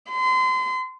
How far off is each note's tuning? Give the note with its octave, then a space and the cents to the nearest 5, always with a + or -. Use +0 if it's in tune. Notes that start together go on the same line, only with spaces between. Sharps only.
C6 -35